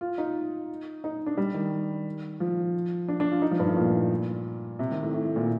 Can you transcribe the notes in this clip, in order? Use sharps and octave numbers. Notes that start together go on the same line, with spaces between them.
F4
D#4
D#4
D4
G3
D#3
F3
D4
D4
F4
D#4
F3
G2
A2
A#2
C3
D#3
A2
A2
A2
A#2